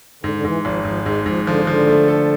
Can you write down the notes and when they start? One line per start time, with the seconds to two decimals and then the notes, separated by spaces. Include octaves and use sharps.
0.24 G#2 D3
0.35 D3
0.44 G#2 E3
0.64 G#1 F3
0.85 G#2 F3
1.05 G#2 G#3
1.26 G#2 F3
1.46 D3 F3
1.67 D3 F3
1.88 A3
2.08 A4